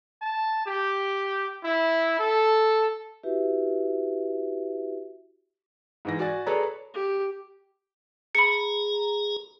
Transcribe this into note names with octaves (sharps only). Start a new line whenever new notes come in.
A5
G4
E4
A4
E4 F#4 G4 B4 E5
G#2 E3 A#6
F#4 D5 G#5 A6
G#4 A4 B4 C#5 D5 A#5
G4
G#4 A#5 B5 C#7